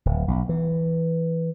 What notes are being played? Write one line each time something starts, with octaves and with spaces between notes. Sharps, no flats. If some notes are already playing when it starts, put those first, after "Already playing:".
D1
B1
E3